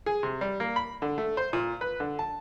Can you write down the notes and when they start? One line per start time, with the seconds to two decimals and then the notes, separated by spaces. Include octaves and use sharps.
0.06 G#4
0.23 C3
0.41 G3
0.60 A#3
0.76 B5
1.02 D3
1.18 A3
1.37 C5
1.53 A#2
1.81 B4
2.00 D3
2.19 A5